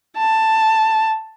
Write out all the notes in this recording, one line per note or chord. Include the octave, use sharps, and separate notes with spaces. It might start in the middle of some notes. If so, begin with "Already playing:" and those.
A5